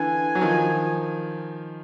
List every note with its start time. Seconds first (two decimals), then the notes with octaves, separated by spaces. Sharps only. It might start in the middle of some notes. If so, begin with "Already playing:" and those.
Already playing: D3 E3 G#5
0.35 F#3
0.41 D#3 F3